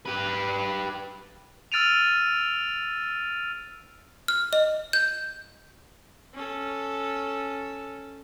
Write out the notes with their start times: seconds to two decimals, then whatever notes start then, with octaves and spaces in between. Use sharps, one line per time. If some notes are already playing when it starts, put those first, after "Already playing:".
0.06 G4 B4
1.72 E6 F6 A6 D7 D#7 F7
4.28 F6
4.53 D#5
4.93 G6
6.34 C#4 A4